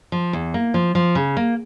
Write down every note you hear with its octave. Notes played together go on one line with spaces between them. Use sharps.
F3
E2
A#3
F3
F3
C#3
A#3